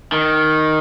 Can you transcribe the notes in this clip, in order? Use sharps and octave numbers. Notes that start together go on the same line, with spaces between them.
D#3